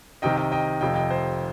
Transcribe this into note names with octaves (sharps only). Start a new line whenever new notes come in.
C2 C3 D#3 D#5 G5
D#5 G5
D#5 G5
F1 F2 C3 F3 D#5 G5
D#5 G5
C5